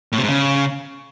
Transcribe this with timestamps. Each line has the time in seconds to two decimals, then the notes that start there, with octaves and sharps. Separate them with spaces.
0.12 A2
0.18 C3
0.23 G#2
0.29 C#3